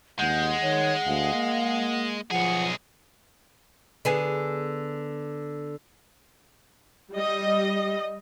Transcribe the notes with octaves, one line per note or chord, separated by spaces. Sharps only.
D#2 G#3 F#5 G6
D#3 C#5
D2 F5
A#3
B1 F3 G#4 F#5
D3 B3 G#4
G3 D#5